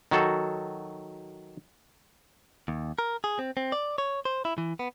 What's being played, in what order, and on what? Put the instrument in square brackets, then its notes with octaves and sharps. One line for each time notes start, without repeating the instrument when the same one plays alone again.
[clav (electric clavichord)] D#3 F#3 F#4 A4
[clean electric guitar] D#2
A#4
G#4
C4
C4
D5
C#5
C5
E4
E3
B3